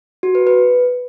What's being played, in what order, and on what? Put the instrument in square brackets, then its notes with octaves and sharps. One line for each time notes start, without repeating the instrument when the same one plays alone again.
[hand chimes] F#4
B4
B4